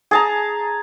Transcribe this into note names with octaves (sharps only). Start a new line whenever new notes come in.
G#4 A5 A#5